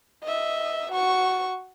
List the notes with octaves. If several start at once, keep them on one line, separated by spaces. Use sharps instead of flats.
D#5 E5
F#4 C#6